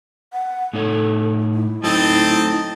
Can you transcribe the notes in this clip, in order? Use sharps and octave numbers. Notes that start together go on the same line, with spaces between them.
F#5
A2 D#4 A4 C#5
E4
F#3 A3 C4 D#4 E4 D#5 A5